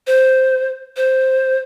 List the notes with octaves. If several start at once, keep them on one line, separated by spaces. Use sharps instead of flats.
C5
C5